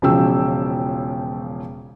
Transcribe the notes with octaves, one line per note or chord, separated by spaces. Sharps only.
E1 C#3 F3 C#4 G5 E6